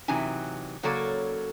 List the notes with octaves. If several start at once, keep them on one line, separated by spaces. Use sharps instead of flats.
C3 E3 F#3 D#4 G#5
C#3 F#3 A#3 A4 C#5 D5